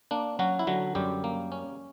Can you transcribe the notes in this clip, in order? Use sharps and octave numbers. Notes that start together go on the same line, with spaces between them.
A#3 D4
F#3 C#4 F#4
E4
D3 F#3 F#4
F#2 G3 G4
A#3
C#4